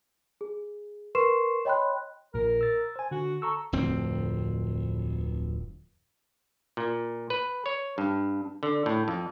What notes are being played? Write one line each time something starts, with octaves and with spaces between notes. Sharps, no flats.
G#4
A#4 B4 C6 C#6 C7 E7
C#5 D#5 G5 B5 C6 F#6
A#1 A#2 A#4
E6 A6
C5 G#5
D3 F#4
A4 A#5 C#6 E6
D1 F2 C4
A#2
B4
C#5
G2
D3
A2
F2